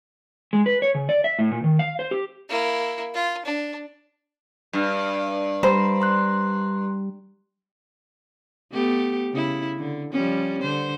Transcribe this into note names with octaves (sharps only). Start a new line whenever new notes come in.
G#3
B4
C#5
C#3
D5
E5
A2
A#2
D#3
F5
C5
G4
A#3 E4
F4
D4
G2
G3 C5 A#5 B5
A#5 C6 F#6
A3 B3 G4
C#3 E4
D3
F3 G3 C#4
D3 C5